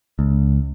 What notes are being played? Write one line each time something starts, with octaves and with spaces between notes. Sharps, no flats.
C#2